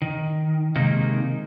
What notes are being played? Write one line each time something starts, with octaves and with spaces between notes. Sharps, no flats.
D#3
C3 D#3 G#3 A#3 D#4